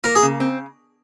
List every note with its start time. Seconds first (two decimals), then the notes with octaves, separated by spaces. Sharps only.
0.04 A#3 A#4
0.15 G#4
0.22 C#3
0.40 C4